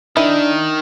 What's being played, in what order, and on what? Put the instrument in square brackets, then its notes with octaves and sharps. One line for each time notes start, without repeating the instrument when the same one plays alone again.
[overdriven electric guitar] D#3 [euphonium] D4 [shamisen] E4